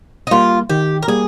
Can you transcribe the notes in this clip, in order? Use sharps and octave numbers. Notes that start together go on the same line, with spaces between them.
D#4
G3 A#3 F4
D#3 G4
A#4
G3 A#3 G#4